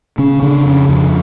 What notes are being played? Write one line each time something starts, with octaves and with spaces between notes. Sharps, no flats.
C#3 C#4
C#3 D4
F2 C#4
F2 D4